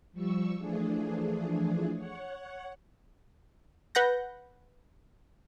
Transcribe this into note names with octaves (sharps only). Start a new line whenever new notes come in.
F3 G3 C#6 E6
E3 F3 A3 D4 G#4
C#5 F#5
B4 F#5 G6 A#6